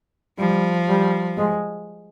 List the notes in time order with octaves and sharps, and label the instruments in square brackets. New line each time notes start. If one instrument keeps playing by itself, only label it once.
[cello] F3 [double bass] G3
[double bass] G3
G#3